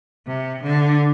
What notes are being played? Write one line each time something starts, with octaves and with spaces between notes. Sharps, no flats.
C3
D3